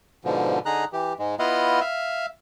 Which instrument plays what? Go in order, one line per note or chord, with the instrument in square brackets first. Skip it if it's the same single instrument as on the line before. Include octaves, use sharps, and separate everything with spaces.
[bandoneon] G#2 B2 D3 F3
D3 D#4 G#4 A#5 F#6
E3 G4
G#2 G#3
B3 E4 F4 D#5 F5 F#5
E5 F5